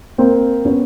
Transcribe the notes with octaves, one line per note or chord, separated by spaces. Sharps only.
A#3 C4
B3 C#4